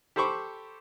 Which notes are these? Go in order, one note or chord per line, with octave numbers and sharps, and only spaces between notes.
G4 A4 C5 B5 C#6 D6